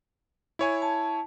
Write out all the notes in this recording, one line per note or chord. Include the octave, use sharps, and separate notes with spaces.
E4 C#5 G#5
A5